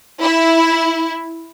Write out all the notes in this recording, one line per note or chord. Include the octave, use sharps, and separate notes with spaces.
E4